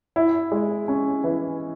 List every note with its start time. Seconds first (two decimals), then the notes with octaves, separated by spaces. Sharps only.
0.16 E4
0.52 G#3
0.88 C#4
1.24 E3